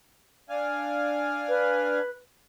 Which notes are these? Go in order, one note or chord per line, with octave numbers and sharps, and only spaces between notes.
D4 F5 G#5
B4